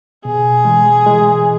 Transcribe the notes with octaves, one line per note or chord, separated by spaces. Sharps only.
B2 G#4
E3 G#3
E3 G#3